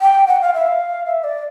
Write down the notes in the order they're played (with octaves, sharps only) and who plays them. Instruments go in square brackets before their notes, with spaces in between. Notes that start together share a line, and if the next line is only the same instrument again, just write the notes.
[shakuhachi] G5
F#5
F5
E5
F5
E5
D5